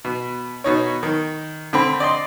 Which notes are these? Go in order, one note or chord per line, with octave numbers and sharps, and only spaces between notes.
B2
B2 D#4 C#5
D#3
D3 C4 B5
D5 D#5 C6